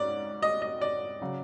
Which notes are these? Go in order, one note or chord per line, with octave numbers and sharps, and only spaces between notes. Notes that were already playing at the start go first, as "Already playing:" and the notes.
Already playing: G#2 C#4 D5
D#5
D#5
D5
C#3 F#3